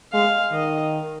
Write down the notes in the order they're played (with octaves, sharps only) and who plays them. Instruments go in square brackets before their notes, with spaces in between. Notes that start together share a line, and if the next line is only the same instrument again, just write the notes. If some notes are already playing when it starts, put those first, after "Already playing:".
[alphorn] G#3 [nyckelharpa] F5
[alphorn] D#3 [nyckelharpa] D#5